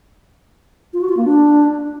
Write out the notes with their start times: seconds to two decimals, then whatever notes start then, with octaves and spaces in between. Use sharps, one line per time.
0.93 F4
1.01 F#4
1.09 F4
1.17 A#3
1.25 D4